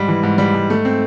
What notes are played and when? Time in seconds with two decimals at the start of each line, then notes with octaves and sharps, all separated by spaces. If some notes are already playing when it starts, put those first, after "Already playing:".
Already playing: G#2 G3
0.08 E3
0.23 G#2
0.38 G3
0.54 G#2
0.70 A3
0.85 C4